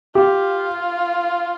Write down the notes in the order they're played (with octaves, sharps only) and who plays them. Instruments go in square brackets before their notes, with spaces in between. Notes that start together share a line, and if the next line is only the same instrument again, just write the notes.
[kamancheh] F4 [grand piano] G4